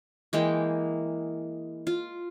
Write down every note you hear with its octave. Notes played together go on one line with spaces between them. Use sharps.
E3 G#3 A#3 G5
F4